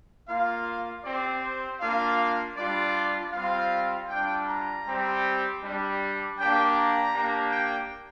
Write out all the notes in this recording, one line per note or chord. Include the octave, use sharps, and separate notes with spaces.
A#3 F4 F5
C4 G4 D5
C5
A#3 D4 F4 F5
G3 D4 F4 D5
G3 C4 F4 F5
G3 D4 F4 G5
A#5
G3 C4 G4
G3 D4 G4
A#3 D4 G4 G5
A#5
A#3 D4 G4
G5